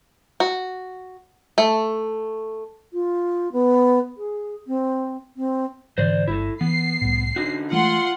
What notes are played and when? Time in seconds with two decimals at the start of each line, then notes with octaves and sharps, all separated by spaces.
0.40 F#4
1.58 A3
2.91 F4
3.52 B3
4.17 G#4
4.67 C4
5.37 C4
5.98 G#2 D3 E3 C5 D5
6.28 G1 E4 A4
6.61 E3 B3 C7
7.01 C2 A2
7.36 D3 C#4 D#4 F#4
7.72 E3 G#3 A3 F4 F#5 C6